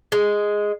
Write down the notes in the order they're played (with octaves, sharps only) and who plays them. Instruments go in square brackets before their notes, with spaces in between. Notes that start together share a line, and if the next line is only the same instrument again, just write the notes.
[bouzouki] G#3